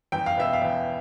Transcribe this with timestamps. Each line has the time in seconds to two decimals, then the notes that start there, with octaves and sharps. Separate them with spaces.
0.12 E2 G5
0.26 F5
0.37 B2 B3 E5
0.53 F5
0.62 E2